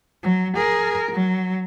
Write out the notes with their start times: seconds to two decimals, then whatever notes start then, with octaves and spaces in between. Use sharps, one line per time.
0.23 F#3
0.57 G#4 A#4
1.11 F#3